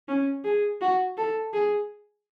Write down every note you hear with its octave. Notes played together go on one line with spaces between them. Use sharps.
C#4
G#4
F#4
A4
G#4